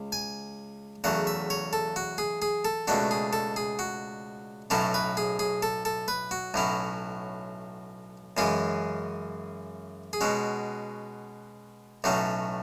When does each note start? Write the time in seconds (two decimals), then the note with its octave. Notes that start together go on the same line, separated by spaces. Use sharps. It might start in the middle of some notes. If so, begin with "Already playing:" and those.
Already playing: C#2
0.12 G#5
1.04 E2 C#3 F#3 A3 F#5
1.27 E5
1.50 C#5
1.73 A4
1.96 F#4
2.18 G#4
2.42 G#4
2.65 A4
2.88 C#2 B2 A3 D4 F#4
3.11 G#4
3.33 A4
3.56 G#4
3.79 F#4
4.70 B1 A2 F#3 C#4 E4 A4
4.94 B4
5.17 G#4
5.39 G#4
5.63 A4
5.85 A4
6.08 B4
6.31 F#4
6.54 B1 A2 F#3 C#4 E4
8.37 F#2 C#3 E3 G#3 G#4
10.13 G#4
10.21 B2 G#3 C#4 F#4
12.04 B1 A2 F#3 A3 C#4